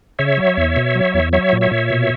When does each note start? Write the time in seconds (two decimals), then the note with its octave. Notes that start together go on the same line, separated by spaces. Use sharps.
0.19 C#3 C#5 E5
0.37 F#3
0.57 E2
0.76 B2
0.95 F#3
1.14 E2
1.33 F#3 C#5 E5
1.53 A#2
1.61 C#5 E5
1.71 A#2
1.90 B2